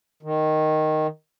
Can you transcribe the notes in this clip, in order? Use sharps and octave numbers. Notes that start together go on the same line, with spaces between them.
D#3